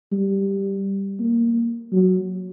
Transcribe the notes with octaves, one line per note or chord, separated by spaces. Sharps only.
G3
A#3
F#3